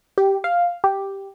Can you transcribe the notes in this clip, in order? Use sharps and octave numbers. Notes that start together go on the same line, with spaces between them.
G4
F5
G4